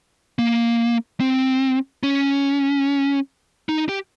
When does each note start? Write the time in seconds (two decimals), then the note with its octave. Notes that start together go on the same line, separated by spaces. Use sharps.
0.39 A#3
1.20 C4
2.03 C#4
3.69 D#4
3.89 G4